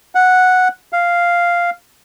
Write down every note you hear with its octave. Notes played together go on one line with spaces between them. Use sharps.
F#5
F5